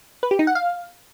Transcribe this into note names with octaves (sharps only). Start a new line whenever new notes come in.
B4
G4
D#4
F#5
F5